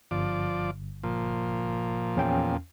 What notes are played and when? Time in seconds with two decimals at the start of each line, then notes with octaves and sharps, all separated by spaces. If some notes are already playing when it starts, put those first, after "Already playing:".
0.11 G1 F3 D5
1.03 A#2 F3
2.16 E2 C#4 G5